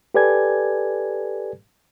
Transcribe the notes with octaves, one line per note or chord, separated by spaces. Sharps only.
G4 A4 B4 D5 G#5 G#6